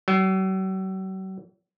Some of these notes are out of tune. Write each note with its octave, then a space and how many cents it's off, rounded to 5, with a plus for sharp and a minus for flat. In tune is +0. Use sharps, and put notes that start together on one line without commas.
F#3 +45